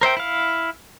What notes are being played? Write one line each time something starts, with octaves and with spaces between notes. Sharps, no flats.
A#4 C5 E5 G5
E4 F5